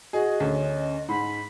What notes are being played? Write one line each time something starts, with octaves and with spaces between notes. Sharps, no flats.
F#4 G#4 D#5
D2 C#4
G#2 B5